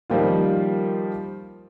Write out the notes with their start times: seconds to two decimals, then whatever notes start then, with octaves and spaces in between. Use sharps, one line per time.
0.10 D#3 F3 G3 A#3 F4